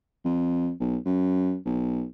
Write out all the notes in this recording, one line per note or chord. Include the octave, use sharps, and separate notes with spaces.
F2
B1
F#2
B1